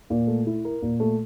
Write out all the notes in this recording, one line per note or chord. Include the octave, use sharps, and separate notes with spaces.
A#2
A3
E4
A#4
A#2
A3